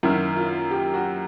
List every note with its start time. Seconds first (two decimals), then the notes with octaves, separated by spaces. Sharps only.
0.03 F#2 D#3 E4
0.36 F4
0.71 G4
0.94 F#4